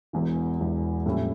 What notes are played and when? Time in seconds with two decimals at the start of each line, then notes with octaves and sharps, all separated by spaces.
0.13 E1 E2 E3
0.60 E1 E2 E3
1.06 A#1 A2 G3 C#4 E4